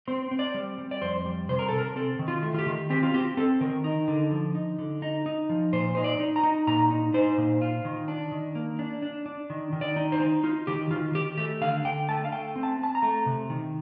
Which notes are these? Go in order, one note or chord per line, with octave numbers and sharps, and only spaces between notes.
C4 C5
C4
D5
G3
G3
D5
F2 C5
G3
C3 C5
A#4
C3 A4
A#4
C4 A4
D#3
F4
A3
F4
G4
D#3
C4 G4
F4
C4 G4
C4 A4
D#3 A#4
D#4
D3
F3
D#4
D3
D#4
D#4
F3
A#2 C5
D#4 C5
D5
D#4
A#5
D#4
A#2 A#5
D#4
D#4 C5
A#2
F4
D#3
D4
D#3
A#3
D4
D4
D4
D#3
D#3
D5
D#4
C5
D#4
D#4 F4
D#3 G4
D#3 F4
D#3 G4
A3 G4
D3 F5
D3 G5
A3 A5
F5
A3 G5
C4
A5
C4 A5
A#5
A3
C3
D#3